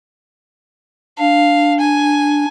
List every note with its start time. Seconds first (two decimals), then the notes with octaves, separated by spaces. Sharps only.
1.18 D4 F5
1.80 G#5